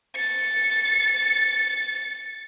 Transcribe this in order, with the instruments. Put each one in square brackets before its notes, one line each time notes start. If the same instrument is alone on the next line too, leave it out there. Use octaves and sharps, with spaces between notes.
[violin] A6 C#7